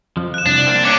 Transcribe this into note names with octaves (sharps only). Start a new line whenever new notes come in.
F2 F3
F#6 E7
C2 D4
A#3 C4
C3 C#4 D6 F#6 D7